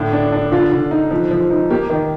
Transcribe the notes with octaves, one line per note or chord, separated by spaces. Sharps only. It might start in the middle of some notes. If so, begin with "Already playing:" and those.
Already playing: A2 D3
D4
D4
D3 F4
D3
D#4
F3
F3
D#4
A#3 G4
D#3